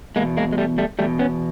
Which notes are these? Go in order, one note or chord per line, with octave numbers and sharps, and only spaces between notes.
E2 B2 G#3 A#3
G#3 A#3
G#3
G3 A3
G3 A3
E2 B2 G3 A3
B3 C#4